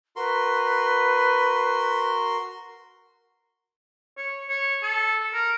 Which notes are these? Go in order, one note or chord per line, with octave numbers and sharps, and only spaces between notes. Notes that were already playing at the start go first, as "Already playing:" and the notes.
F#4 A#4 B4 C6
C#5
C#5
A4
A#4